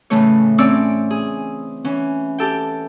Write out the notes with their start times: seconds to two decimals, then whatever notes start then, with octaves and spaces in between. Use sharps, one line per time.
0.10 A2 C#3 E3 A3 C#5
0.58 C4 C#4 C#5 D5 E6
1.11 G#4
1.85 E3 C#4
2.38 G4 A4 G5